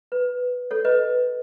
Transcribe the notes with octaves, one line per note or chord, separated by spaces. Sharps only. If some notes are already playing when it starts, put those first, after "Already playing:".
B4
A4 C#5
B4 D#5